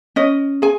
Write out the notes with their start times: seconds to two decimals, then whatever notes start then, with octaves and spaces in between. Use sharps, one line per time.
0.16 C#4 D#5
0.62 G#4 G#5